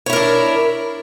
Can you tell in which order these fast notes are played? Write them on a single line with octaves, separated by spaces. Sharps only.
C#5 E4 A#4 D4